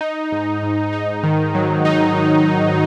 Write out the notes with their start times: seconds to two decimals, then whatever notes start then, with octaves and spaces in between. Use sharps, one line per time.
0.01 D#4
0.32 G#2
0.63 G#2
0.93 D#4
1.24 D#3
1.55 F#3
1.85 D#4
2.15 D#3